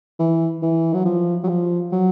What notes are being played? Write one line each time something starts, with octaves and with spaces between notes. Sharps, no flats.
E3
E3
F#3
F3
F#3
F3
F#3